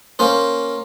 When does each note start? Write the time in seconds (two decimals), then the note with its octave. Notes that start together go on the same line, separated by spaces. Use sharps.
0.19 A#3 C#4 C5